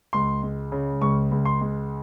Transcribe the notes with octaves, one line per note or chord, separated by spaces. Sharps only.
C#2 C6
G#3
C#3
C#2 C#6
C#2
C6
G#3